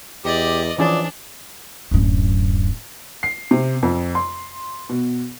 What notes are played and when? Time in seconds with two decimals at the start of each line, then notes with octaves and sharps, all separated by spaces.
0.24 E2 G4 D5 D#5
0.78 E3 F3 C#4 D4 G#4 D5
1.91 D1 F#2
3.23 C7
3.51 C3
3.83 F2
4.15 C6
4.89 B2